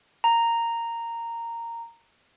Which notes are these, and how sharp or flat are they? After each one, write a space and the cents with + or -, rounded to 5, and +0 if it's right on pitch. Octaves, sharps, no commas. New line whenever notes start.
A#5 -10